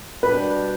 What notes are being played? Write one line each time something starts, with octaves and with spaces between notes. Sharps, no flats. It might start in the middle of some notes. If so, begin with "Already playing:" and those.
B2 G3 D4 G4 B4